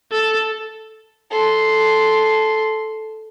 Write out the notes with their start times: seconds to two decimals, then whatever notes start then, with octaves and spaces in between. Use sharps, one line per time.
0.12 A4
1.30 A4 C6